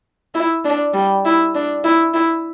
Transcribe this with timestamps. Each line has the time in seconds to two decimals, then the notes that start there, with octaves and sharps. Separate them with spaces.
0.35 E4
0.65 D4
0.94 G3
1.25 E4
1.55 D4
1.84 E4
2.14 E4